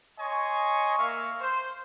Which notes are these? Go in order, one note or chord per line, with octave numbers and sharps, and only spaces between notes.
C#5 D#5 G#5 C6 C#6
A#3 E5 F5 C#6
C5